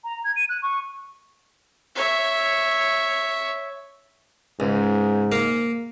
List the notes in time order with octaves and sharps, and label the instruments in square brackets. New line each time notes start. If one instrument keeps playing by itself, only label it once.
[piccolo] A#5
G#6
D#7
F#6
C#6
[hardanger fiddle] C#5 E5
[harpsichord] C#2 [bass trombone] G#2
[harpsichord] A#3 F5